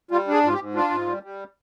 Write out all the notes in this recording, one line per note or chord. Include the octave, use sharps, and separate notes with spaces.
G3 F4
D4
G#4
G#2 F4
G4
G#2
D4 F4
G#2
G3
G3